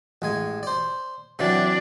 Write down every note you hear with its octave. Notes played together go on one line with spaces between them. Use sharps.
A1 G#3 G#5
C5 D5
C3 E3 F#3 D4